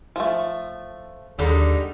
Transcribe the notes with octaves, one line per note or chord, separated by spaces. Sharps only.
F3 A3
D#2 D3 G3 G#3 D#4